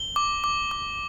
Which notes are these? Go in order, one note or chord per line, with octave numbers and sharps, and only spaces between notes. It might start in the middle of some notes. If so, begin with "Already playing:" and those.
Already playing: G7
D6
D6
D6